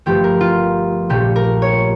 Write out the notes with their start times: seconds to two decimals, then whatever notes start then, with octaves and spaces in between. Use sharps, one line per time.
0.06 G1 G2 F3 A3 G4
0.24 A#4
0.41 F4
1.09 A#1 A#2 F3 A3 G4
1.36 A#4
1.62 C#5